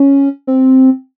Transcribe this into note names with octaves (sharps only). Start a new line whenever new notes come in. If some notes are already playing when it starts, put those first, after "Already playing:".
Already playing: C#4
C4